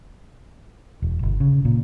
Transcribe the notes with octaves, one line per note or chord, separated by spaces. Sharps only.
E1
G1
C#3
A#2